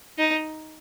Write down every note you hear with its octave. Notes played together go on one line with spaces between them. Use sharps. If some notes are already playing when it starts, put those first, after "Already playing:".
D#4